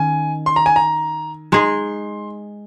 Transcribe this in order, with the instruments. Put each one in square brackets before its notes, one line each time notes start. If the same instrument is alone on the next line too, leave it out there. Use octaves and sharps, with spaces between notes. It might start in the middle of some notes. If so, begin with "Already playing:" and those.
Already playing: [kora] D#3 C#4 [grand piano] G#5
[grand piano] C6
A#5
G#5
A#5
[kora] G#3 D#4 G#4 [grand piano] C6